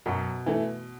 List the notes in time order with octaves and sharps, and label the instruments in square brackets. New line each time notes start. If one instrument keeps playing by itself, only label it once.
[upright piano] F#2 [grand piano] B2
[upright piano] E3 A3